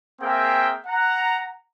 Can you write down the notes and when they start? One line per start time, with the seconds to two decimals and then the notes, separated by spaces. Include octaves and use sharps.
0.22 A#3 C4 G#4 A#4 E5 G5
0.87 F#5 A#5